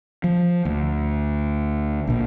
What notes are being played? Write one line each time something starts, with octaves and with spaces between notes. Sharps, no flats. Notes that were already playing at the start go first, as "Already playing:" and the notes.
F3
D2
A#1 A#2